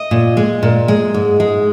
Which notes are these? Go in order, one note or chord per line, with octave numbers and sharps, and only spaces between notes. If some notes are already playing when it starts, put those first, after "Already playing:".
Already playing: D#5
A#2
G#3
A#2
G#3
G#2
G#3